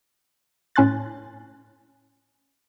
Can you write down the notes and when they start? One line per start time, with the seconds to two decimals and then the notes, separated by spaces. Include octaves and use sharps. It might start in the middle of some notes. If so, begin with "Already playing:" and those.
0.76 A2 C#4 G#5 C6 F#6 A6